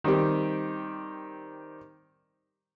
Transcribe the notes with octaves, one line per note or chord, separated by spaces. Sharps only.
D#3 G3 C4 G4